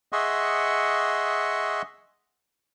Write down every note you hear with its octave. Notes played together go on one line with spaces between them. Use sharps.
G#4 D#5 E5 F#5 C6 C#6